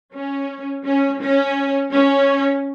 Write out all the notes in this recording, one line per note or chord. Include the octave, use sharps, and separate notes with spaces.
C#4
C#4
C#4
C#4